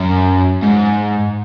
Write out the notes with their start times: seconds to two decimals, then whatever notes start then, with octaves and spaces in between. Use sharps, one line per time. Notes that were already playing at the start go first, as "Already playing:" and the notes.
Already playing: F#2
0.63 G#2